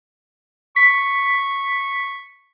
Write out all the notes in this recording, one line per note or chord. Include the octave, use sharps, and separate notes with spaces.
C#6 B6